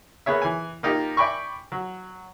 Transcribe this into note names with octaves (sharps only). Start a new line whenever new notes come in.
A#3 B3 G#4 C#5 E5
E3 G#5
A#3 D#4 F4 G4
D5 E5 G5 G#5 B5 C#6
F#3